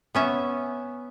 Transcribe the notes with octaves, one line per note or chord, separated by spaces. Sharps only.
B3 C#4 E5